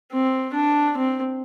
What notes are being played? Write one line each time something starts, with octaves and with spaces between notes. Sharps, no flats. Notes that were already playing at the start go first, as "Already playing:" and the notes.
C4
D4
C4